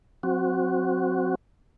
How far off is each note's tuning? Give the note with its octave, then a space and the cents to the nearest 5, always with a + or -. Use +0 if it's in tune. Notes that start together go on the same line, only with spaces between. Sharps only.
F#3 -30 C4 +0 F#4 +0